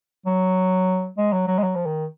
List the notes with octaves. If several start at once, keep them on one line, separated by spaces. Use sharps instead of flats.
F#3
G#3
F#3
F#3
G#3
F#3
F3
D#3